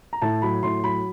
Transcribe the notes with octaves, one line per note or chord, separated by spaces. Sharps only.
A#5
A2 A5
F#3 B5
A2 C6
F#3 B5